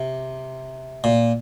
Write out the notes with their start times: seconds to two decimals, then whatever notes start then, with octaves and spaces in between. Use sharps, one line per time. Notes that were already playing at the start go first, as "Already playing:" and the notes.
Already playing: C3
1.04 A#2